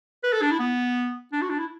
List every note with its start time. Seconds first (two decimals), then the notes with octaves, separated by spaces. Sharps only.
0.23 B4
0.33 A4
0.42 D4
0.51 E4
0.60 B3
1.33 D4
1.42 F#4
1.50 D4
1.59 E4